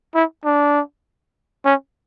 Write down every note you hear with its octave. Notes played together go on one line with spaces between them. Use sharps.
E4
D4
C#4